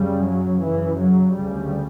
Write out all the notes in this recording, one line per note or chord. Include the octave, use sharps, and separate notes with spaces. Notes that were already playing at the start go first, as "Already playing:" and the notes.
Already playing: F#2 C#3 G3
F#3
F#2 C#3 E3
F#3
D2 C#3 G3